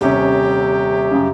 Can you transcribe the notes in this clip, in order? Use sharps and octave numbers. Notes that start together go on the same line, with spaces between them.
D#1 C3 C#4 G4
F#2 C#3